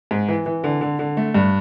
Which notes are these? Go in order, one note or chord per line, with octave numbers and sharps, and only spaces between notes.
G#2
E3
E3
D3
D3
D3
A3
G2